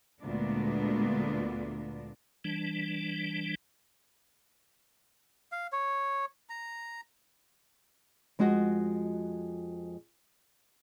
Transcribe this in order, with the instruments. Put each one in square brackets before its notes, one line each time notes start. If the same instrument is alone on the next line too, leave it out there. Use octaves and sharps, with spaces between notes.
[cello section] D2 A#2 G#3 B3 D4
[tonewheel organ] E3 G3 D4
[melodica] F5
C#5
A#5
[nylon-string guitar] F2 G#3 F4 F#4 D#5